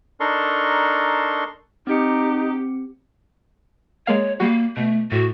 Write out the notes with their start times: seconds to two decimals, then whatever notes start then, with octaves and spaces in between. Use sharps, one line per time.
0.20 D4 D#4 A4 A#4 C6 C#6
1.87 C4 D#4 G4 C#7
4.07 G#3 A#3 C#5 F5
4.40 G3 A#3 F#4
4.77 B2 A3
5.12 A2 F#4